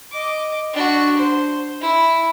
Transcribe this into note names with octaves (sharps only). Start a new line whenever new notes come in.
D#5 D6
D4 F#4
C5
E4